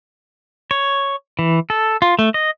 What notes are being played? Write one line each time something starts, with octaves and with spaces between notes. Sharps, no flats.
C#5
E3
A4
F4
A3
D#5